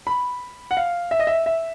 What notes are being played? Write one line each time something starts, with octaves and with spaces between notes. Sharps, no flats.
B5
F#5
F5
E5
D#5
E5
E5